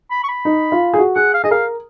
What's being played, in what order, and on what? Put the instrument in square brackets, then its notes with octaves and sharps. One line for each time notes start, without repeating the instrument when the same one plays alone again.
[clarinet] B5
C#6
B5
[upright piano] D#4
F4
G#4
F#4
[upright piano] G#4 [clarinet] F#5
[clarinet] F5
[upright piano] G#4 [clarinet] D#5
[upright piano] A#4 [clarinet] F5